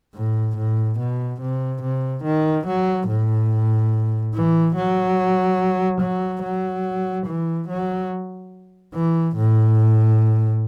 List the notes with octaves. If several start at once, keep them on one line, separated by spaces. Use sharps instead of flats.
A2
A2
B2
C3
C3
D#3
F#3
A2
E3
F#3
F#3
F#3
E3
F#3
E3
A2